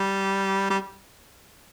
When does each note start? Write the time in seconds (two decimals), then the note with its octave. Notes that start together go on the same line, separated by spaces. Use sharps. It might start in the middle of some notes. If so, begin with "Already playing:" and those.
Already playing: G3
0.70 G3